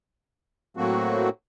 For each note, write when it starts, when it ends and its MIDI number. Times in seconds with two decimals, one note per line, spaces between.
0.77 1.29 45
0.77 1.29 54
0.77 1.29 57
0.77 1.29 58
0.77 1.29 60
0.77 1.29 66